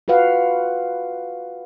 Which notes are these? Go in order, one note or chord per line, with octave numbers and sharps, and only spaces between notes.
F4 F#4 B4 F5 F#5